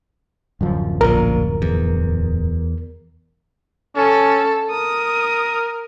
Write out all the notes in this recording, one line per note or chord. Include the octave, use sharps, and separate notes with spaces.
D1 F#2 F3
A#1 A#2 A#4
E2
C#4 A4
A#4 D#6